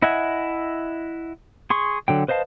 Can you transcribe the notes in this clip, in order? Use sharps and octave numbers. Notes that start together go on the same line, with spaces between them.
E4 D#5 E5 F#5 G#5
G#4 C6 C#6
D3 F#3 G5
B4 C5 D#5 F5 A5